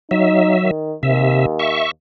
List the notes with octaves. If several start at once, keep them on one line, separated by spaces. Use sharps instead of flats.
F#3 D#4 E5
D#3
D#2 C3 E5
E5 C#6